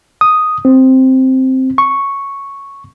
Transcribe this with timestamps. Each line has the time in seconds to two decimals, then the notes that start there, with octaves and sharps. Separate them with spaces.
0.21 D#6
0.65 C4
1.78 C#6